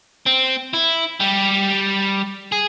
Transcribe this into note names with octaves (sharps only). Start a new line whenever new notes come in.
C4
E4
G3 G4
G#4